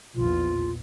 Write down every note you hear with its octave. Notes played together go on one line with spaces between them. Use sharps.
A#1 E2 F4